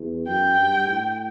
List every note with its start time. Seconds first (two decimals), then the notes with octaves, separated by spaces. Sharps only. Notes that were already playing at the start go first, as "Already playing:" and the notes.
Already playing: E2
0.27 F#2 G5
0.57 G2
0.87 A2